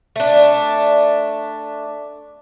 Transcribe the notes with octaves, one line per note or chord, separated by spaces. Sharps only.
A3 D4